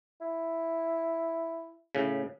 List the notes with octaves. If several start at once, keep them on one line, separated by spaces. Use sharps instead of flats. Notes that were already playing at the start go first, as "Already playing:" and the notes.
E4
A2 C#3